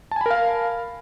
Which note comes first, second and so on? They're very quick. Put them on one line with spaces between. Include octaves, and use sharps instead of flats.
A5 G#5 B5 A#4 F5